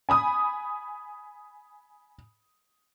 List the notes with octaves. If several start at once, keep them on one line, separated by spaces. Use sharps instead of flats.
G#5 B5 D#6